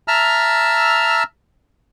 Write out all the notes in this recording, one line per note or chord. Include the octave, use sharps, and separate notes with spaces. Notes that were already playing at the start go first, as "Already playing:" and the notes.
E5 A5 A#5 E6 F6